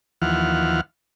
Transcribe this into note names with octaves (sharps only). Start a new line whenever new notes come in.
D#2 E3 F3 F#5 F6